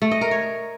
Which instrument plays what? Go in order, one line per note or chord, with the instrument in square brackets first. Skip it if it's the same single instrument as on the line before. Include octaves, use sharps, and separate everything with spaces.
[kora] A3
D#5
A#4
C#5